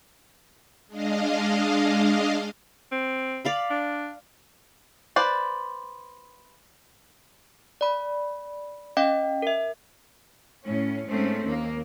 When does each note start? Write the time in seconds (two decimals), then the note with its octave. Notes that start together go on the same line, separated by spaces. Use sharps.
0.87 G#3 D4 D#5 F5
2.92 C4
3.45 D5 F5 B5
3.70 D4
5.16 B4 C5 D5
7.81 D5 B5
8.97 C#4 D#5 F5 G5
9.42 A#4 E5
10.65 A2 C#4
11.08 G#2 A3 C4 C#4
11.45 D#2 A#3